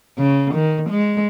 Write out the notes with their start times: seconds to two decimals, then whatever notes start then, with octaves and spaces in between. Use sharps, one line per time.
0.18 C#3
0.54 D#3
0.90 G#3